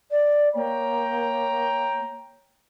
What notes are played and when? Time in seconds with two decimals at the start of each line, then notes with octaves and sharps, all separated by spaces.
0.11 D5
0.55 A#3 C#5 G5 A#5